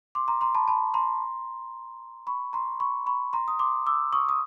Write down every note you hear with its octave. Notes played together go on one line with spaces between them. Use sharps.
C6 D6
A#5 C6
A#5 C6
A5 B5
A5 B5
A#5 C6
B5 C#6
A#5 C6
B5 C#6
B5 C#6
A#5 C6
D#6
C6 D6
D6 E6
C#6 D#6
D#6